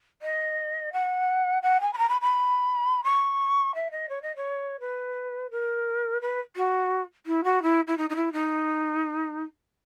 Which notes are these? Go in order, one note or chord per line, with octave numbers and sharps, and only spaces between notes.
D#5
F#5
F#5
G#5
B5
A#5
B5
B5
C#6
E5
D#5
C#5
D#5
C#5
B4
A#4
B4
F#4
E4
F#4
E4
E4
D#4
D#4
E4
D#4